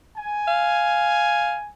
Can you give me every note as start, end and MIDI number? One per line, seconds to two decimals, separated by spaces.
0.17 1.69 80
0.48 1.56 77